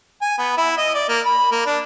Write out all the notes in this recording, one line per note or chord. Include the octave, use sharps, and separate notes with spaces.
G#5
B3
E4
D#5
D5
A#3
B5
A#3
D4